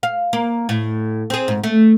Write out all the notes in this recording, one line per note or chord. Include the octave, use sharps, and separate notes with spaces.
F5
A#3
A2
C4 G#4
G#2
A3